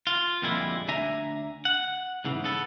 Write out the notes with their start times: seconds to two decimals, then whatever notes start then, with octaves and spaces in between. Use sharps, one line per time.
0.07 F4
0.42 F2 A#2 D3 G3 G#3 E4
0.88 D2 D4 E5 G#5 A#5
1.65 F#5
2.25 G#2 C#3 E3
2.44 B3 A4